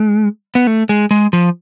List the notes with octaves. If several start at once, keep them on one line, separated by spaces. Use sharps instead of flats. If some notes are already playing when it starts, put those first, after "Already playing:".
Already playing: G#3
B3
A3
G#3
G#3
F3